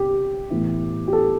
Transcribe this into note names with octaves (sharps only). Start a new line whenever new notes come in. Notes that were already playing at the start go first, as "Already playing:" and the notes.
Already playing: C3 G4
A2 E3 B3 E4
G4
A4